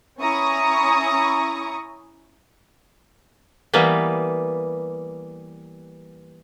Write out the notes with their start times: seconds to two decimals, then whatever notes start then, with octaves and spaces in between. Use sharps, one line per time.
0.20 C#4 E4 A#5 C#6 D#6
3.74 E3 G3 A#3 B3